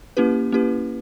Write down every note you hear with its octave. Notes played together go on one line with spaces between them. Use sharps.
A#3 C#4 E4 G4 B4
A#3 C#4 E4 G4 B4